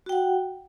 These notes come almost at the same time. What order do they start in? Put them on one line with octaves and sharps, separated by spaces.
F#4 G5 F#5